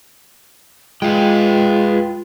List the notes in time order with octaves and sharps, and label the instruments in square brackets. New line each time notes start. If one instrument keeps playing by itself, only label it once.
[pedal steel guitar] G#3 [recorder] F4 [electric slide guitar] B4 F5 G5